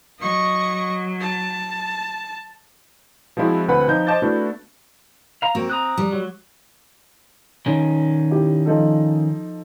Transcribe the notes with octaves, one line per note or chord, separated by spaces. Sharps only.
F#3 D#5 C#6
A5
F3 G#3 C4 E4 F#4
D2 C4 B4 F#5 B5
F3 D#4 G6
C5 D#5 A5 D6 G6 A6
A3 B3 D4 E4 F#4
F5 A#5
A#3 C4 F#4
A#5 D#6 F#6
G3
F#3
D#3 C#4
E4 G4
F3 D#4 A4